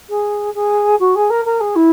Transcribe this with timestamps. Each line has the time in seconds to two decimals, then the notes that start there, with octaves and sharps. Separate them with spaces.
0.09 G#4
0.54 G#4
0.99 F#4
1.15 G#4
1.30 A#4
1.45 A#4
1.60 G#4
1.75 E4